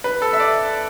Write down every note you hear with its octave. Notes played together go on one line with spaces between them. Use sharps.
B4
A4
E5
D5